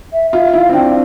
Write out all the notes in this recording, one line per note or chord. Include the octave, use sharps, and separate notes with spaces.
E5
F4 E5
E4 F5
C4
D4 G5